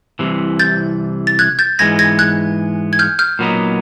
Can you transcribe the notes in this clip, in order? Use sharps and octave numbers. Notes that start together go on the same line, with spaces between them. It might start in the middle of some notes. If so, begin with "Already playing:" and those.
C2 C3 E3
G6 A6
A6
F#6 G#6
G6 A6
G#2 E3 G#3 B3 G#6 A#6
G#6 A#6
F#6 G#6
G#6
F6 G6
F6 G6
A#2 F#3 B3 D#4